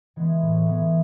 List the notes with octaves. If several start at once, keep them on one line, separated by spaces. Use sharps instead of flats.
E3 G#3 B3
A2
E3 G#3 B3